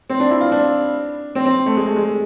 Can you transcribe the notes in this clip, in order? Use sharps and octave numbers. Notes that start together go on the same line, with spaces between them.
C4
D4
E4
F4
D4
C4
C4
A3
G#3
A3
G#3